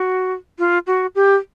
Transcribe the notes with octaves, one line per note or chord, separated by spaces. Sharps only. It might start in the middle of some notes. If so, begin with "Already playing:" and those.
Already playing: F#4
F4
F#4
G4